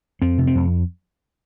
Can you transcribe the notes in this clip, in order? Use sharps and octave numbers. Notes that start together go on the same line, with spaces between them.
F2 C4
C3
C4
F2